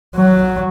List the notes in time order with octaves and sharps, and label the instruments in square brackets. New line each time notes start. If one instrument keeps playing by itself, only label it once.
[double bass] F#3